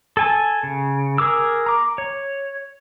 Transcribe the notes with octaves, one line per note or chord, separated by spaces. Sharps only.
A4 G#5 A5
C#3
G#4 A#4 D6 E6
A#5 D6
C#5